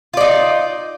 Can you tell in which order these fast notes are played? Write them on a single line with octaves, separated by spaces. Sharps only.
F4 D5 D#4